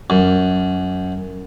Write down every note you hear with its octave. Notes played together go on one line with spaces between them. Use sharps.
F#2